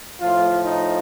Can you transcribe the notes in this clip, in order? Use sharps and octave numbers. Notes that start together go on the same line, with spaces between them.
A2 F3 F4
D#4